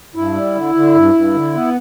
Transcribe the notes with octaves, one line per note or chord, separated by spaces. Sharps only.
G2 E4
G3
D3
D3
G2
G2
D3
B3